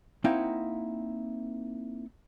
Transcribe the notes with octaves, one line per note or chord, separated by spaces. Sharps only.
A#3 C4 D#4 E4 F#5 G5